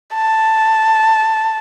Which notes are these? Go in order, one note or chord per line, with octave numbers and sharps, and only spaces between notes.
A5